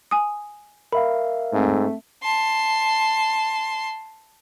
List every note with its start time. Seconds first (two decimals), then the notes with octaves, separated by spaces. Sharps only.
0.11 G#5 D#6
0.93 A#4 E5 F5 B5
1.53 G#2 A3 C4
2.23 A5 C6